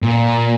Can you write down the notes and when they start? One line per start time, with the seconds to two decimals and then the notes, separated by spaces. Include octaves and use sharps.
0.02 A#2